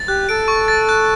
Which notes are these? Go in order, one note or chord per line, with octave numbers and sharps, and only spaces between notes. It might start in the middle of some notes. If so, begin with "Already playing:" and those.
Already playing: A6
G4 F#6
A4 D7
C#6
A6
F#6